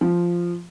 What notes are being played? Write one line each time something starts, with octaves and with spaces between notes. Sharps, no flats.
F3